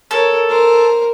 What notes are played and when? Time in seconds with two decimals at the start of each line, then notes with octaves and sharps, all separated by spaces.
0.11 A4 A#4 C#5
0.49 A#4 C5